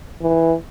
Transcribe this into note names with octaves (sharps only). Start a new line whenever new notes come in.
E3